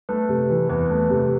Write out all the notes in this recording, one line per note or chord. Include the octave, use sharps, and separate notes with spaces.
A3 B4
C3
E3
E2 B4
A3
C3